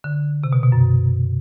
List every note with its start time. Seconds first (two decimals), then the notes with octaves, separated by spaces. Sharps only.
0.04 D3
0.44 C3
0.53 B2
0.63 B2
0.72 F#2